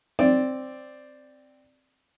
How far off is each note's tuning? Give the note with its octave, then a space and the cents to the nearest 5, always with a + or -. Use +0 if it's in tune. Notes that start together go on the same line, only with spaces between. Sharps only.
C4 +0 D5 +0